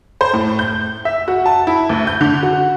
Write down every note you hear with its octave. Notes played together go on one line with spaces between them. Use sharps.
C5
A2
G6
E5
F#4
A5
E4
D2
G6
D3
F#4